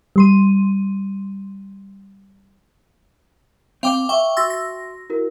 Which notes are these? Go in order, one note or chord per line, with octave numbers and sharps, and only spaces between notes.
G3 C6 D#7
C4 F5 G5 D6
E5 G5 C#6
F#4 C6 E6 A6 A#6
A#6
E4 F#4 A#4